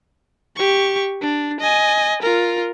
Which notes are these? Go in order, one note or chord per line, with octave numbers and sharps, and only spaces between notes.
G4 C#6
D4
D#5 G#5
F4 A#4